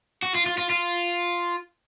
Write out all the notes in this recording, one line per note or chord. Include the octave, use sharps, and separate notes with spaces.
F#4
F4
F4
F4
F4